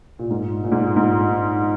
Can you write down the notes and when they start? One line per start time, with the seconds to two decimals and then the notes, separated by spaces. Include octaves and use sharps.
0.19 A#2
0.30 G#2
0.64 A#2
0.72 G#2
0.80 A#2
0.96 G#2